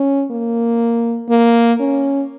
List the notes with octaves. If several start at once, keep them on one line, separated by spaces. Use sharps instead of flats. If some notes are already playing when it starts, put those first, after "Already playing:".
Already playing: C#4
A#3
A#3
C#4